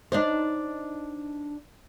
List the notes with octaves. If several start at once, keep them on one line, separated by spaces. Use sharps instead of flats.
D4 D#4 C5